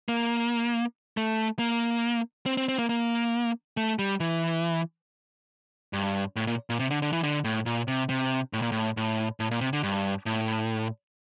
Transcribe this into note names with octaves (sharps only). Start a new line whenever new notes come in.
A#3
A3
A#3
C4
C4
C4
A#3
A#3
A3
G3
E3
G2
A2
A#2
A#2
C3
D3
D3
E3
D3
A2
A#2
C3
C3
A2
A#2
A2
A2
A2
A#2
C3
D3
G2
A2